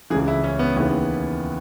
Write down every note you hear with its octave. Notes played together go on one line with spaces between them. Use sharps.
C#2 C#3 E3 G#4
E4
C#4
B3
D#2 C#3 E3 B3